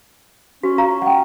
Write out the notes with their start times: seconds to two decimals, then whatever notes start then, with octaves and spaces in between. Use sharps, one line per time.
0.63 C#4 F#4
0.78 F4 F5 A#5
1.02 F#5 G5